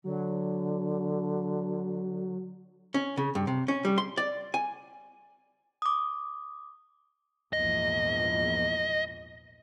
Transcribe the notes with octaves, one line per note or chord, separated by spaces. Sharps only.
D3 F#3
C#4
C#3
G2
C3
C#4
G3
C6
D5
G#5
D6 D#6
A#1 E2 G#2 D#5